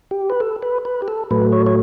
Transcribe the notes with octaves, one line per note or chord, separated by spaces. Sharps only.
G4
B4
A4
B4
B4
G4
A4
A2 F#3 A3 B4
C#5
C#5